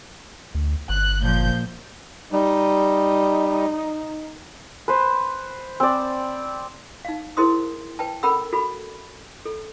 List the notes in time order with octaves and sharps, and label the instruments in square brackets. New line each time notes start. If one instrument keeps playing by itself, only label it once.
[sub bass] D2
[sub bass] G1 [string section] F#6
[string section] A#2 F3 G6
[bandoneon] G3 [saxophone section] D#4
[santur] B4 C5
C4 D5
[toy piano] D#4 F5
E4 G#4 A#4 C5 C6 D#6
B4 G5 A5
C#4 A4 A#4 F#5 B5 E6
F#4 A4 B5
A4